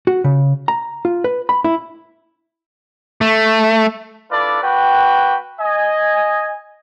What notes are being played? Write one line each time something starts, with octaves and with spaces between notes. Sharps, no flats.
F#4
C#3
A#5
F4
B4
B5
E4
A3
D4 E4 F4 A4 B4 D5
A#3 F#4 B4 G5
D#5 G#5